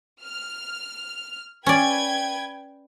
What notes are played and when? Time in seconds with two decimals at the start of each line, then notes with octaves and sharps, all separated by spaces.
0.23 F6
1.66 C#4 B4 D5 G5 G#6